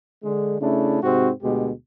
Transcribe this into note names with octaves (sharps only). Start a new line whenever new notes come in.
D3 G#3
C#3 A3 D4 E4
G#2 C3 C4 F#4
D2 B2 G#3 G4